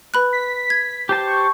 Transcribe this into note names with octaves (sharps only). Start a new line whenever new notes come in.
B4 B5 F#6
B6
G#6
G4 C5 A5
C#6